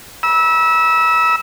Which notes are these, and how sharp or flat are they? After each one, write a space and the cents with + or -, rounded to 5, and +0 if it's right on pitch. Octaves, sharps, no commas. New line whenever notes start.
B5 -40 E6 -15